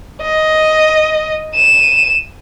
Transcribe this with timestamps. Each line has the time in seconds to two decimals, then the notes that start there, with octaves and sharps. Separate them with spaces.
0.22 D#5
1.55 D#7 E7